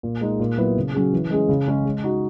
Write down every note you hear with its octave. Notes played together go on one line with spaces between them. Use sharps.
A#2
G#3 D#4 G#4
A#2
F#3 B3 E4
C#3
F#3 C#4 G#4
E3
G#3 C#4 G#4
C#3
G#3 C#4 G#4
G#3
D#4 F#4